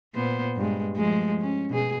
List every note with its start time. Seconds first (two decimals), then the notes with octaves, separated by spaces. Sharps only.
0.14 A#2 B3 C5
0.57 G2 G#3
0.96 F3 G#3 A3
1.40 C#4
1.70 B2 G#4